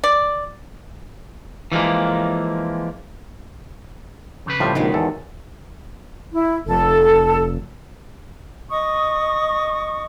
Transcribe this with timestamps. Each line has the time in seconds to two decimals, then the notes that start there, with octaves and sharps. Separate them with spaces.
0.04 D5
1.72 E3 F3 G#3 A#3
4.46 F2 C#3 B4
4.60 A2 F3 G3 E5
4.75 A#1 D#3 F#3 G#3
4.94 E2 A4
6.33 E4
6.66 F1 A4
8.70 D#5 C#6 D#6